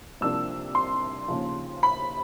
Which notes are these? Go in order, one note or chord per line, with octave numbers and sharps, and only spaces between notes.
C2 C3 F3 A#3 D4 E6
C6
D#2 C#3 F3
B5